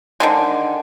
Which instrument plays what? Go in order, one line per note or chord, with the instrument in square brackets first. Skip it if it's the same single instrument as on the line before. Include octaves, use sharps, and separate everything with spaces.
[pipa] D3 D#3 G#3